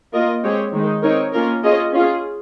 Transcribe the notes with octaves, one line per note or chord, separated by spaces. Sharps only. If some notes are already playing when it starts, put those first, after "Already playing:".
A#3 F4 A#4 D#5
G#3 C4 G4 C#5
D#3 G#3 D#4
C4 D#4 A#4 C#5
A#3 C#4 F4 A#4
C#4 F4 G#4 D#5
C#4 F4 G#4